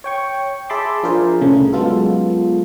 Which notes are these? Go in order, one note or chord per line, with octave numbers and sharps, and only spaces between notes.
C#5 G5 C#6
G#4 E5 A5 B5 C6 D6
F3 D4 F4 G#4 A#4 C5
C2 A2 C#3 A3
F#3 G#3 B3 F4 A4